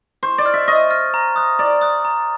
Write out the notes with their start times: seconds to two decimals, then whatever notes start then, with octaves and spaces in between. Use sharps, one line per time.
0.23 C5 C#6
0.38 D5
0.46 F6 A6
0.54 E5
0.68 D#5 C#6
0.91 F6 A6
1.14 A#5
1.36 D#6 F#6
1.59 D5 A#5
1.81 D#6 F#6
2.05 A#5